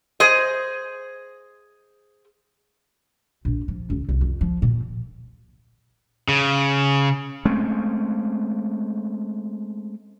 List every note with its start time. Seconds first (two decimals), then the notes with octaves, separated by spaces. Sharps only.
0.20 G#4 C5 D#5
3.45 A#1
3.68 F3
3.90 C#2
4.09 C2
4.21 F2
4.41 F3
4.62 A#2
6.28 C#3
7.45 G#3 A3 C4 C#4